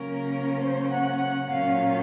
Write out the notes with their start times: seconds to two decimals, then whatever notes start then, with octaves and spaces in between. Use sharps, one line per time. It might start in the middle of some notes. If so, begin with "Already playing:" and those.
Already playing: C#3 F#3 A#3 C#4 A#4
0.60 C5
0.90 F#5
1.21 F#5
1.51 A#2 F#3 C#4 F5